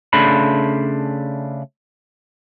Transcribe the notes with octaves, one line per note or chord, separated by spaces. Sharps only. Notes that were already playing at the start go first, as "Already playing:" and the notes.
C#3 A3 D4 C5 B5